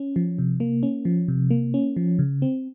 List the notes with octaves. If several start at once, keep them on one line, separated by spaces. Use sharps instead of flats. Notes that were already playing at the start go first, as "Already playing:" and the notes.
Already playing: C#4
F3
C3
A#3
C#4
F3
C3
A#3
C#4
F3
C#3
C4